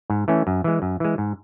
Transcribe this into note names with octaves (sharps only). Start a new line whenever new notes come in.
G#2
E3 A3 C#4
F#2
E3 G#3
F#2
E3 G#3
G#2